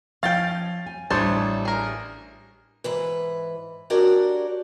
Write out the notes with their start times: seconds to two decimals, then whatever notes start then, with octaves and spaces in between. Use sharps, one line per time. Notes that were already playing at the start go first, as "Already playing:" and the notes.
0.23 F3 C#4 F5 G5 A6
0.86 G#5
1.10 A1 G3 G#3 D4 E4 C5 C#5 A5
1.65 G#4 A#4
2.84 G#2 E3 B4
3.90 D4 F#4 G4 A#4 C#5 D5